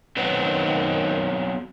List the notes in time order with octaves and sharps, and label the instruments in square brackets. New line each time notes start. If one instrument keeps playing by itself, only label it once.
[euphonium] D#3 [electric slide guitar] F#3 B3 C4